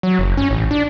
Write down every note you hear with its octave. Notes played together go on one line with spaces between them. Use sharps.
F#3
F#1
C#4
A1
D4